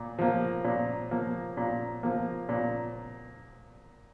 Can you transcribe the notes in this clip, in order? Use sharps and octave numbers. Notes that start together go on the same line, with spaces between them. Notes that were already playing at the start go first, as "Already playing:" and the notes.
Already playing: A#2
F3 A#3
A#2
F3 A#3
A#2
F3 A#3
A#2